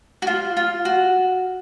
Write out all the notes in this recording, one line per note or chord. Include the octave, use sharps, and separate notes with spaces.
F#4
F4
F4
F#4